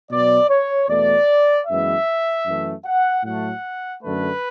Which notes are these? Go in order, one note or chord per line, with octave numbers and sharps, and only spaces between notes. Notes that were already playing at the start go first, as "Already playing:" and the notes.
B2 F#3 B3 D5
C#5
E2 B2 A3 D5
F#2 E3 G#3 B3 E5
F#2 E3 A3
F#5
A2 F#3 A3 F#5
F#2 D3 A3 B4